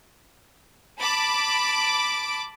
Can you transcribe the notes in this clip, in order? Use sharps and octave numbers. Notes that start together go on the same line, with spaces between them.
A5 B5 D6